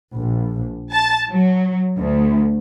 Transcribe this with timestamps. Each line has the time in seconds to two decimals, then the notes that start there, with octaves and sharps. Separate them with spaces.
0.16 A#1
0.92 A5
1.28 F#3
1.98 D2